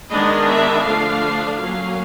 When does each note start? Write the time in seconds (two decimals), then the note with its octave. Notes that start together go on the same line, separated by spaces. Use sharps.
0.11 D#3 G#3 B3 D4 D#5
0.48 E5
0.86 D3 F3 A3 D4 F5
1.60 F#3 A#3 C#4 F5